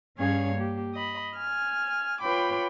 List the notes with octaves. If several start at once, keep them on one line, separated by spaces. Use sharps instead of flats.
G2 C#4 G#4 C#5 F5 G#6
A#3 G4
D#5 B5
G#5 F6
F4 B4 C#5 G5 B5 D6